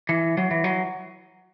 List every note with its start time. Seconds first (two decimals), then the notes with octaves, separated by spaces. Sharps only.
0.09 E3
0.37 F#3
0.51 E3
0.64 F#3